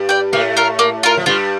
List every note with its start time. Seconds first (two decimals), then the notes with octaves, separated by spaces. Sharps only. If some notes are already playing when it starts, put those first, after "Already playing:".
Already playing: G2 G3
0.09 D5 G5
0.33 A2 A3 A#3
0.57 F4 A#4
0.79 A#3
1.03 F4 A#4
1.17 F3
1.26 G2 G3 F4